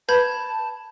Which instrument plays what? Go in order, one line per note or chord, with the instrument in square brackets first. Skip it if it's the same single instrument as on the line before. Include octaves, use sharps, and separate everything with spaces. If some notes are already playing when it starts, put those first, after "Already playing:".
[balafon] B4 [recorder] A5 [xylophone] B5 G6 G#6